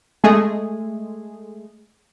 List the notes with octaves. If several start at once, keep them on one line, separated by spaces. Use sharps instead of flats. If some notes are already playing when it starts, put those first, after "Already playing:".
G#3 A3 G#4